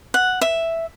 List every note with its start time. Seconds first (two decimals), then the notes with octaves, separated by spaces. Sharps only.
0.14 F#5
0.41 E5